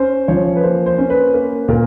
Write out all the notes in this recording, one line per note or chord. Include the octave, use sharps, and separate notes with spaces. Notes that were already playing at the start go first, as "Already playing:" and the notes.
Already playing: C#4 C5
F3 C#5
B4
A#3 C5
C5
C#4
B4
A#3
A#2 A#4